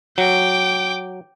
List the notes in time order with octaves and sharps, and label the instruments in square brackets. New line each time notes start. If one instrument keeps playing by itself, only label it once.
[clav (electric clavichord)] F#3 [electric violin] G5 D6